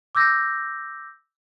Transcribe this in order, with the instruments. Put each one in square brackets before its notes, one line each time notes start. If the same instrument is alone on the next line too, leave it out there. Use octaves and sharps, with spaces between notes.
[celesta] D6 E6 G6 A#6